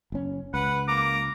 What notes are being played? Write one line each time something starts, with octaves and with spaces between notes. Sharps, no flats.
F#1 C#4
C#2 B4 F#5
A#3 A#5 D6